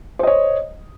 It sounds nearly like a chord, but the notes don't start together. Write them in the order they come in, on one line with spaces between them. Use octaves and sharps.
C5 D#5 C#5